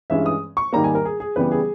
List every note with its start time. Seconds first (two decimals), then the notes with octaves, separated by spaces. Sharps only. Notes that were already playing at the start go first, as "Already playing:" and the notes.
0.10 G2 E3 G#3 C#4 E5
0.26 D#6
0.57 C#6
0.73 G#2 D#3 G3 A#3 A#5
0.84 G#5
0.95 A#4
1.05 G#4
1.20 G#4
1.36 C#3 E3 G3 B3 B4
1.52 G#4